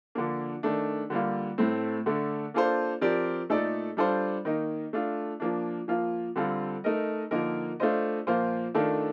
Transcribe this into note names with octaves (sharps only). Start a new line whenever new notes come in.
D3 F3 A#3 D4
D#3 A3 D4
D3 G3 A#3 F4
A2 A3 C4
D3 A3 D4
A#3 D4 F4 A4 C5
F3 C4 G4 A#4 D5
A#2 A3 D#4 A4 D5
G3 D4 F4 A4 C5
D#3 A#3 D#4
A3 D4 F4
F3 A#3 D4
F3 A#3 F4
D3 G3 C4 F4 A4
A3 D#4 A#4 D#5
D3 F3 A#3 D#4 A#4
A3 D4 F4 C5 D#5
A#2 F3 A#3 F4 C5
D#3 A3 D4 F4 A4